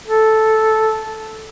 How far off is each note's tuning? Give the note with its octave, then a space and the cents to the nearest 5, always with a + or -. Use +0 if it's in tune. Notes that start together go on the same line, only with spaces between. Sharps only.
A4 -5